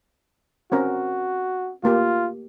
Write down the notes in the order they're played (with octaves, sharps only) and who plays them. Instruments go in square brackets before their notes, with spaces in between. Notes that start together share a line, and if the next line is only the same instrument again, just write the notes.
[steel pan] C4 C#4 A#4 [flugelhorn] F#4
[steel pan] A3 A#3 G4 [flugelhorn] F4